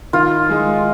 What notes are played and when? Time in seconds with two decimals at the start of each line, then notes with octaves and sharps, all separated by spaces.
0.13 D#3 F4
0.49 G#3 D#4